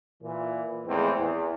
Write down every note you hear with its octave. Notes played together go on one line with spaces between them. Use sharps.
A#2 E3
E2 A2 F3 G#3 C4
E2